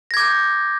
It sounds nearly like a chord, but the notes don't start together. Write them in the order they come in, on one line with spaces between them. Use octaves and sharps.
A#6 G#6 D6 G6